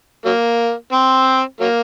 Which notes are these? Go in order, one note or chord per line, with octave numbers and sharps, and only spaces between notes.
F#3 A#3
C4
F#3 A#3